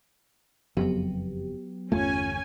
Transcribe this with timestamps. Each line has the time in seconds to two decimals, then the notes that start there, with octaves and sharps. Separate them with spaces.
0.77 F#1 F2 F#3 B3 G4
1.92 G1 E2 A3 C#4 F4 G#5